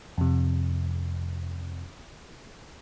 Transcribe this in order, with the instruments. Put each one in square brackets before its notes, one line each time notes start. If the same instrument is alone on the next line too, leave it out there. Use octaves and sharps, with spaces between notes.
[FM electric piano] F2 C3